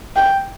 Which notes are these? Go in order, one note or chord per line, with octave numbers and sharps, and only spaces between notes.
G5